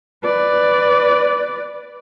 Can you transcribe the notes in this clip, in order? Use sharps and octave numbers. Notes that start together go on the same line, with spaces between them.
B4 D5